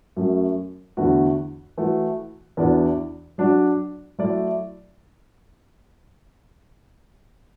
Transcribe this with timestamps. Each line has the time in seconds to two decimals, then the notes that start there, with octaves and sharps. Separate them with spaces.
0.16 F#2 F#3 A3
0.97 E2 D3 A3 F#4
1.78 E3 A3 F#4
2.57 E2 E3 D4 F#4 D5
3.38 F#3 D4 F#4 D5
4.18 F#3 A3 E4 D5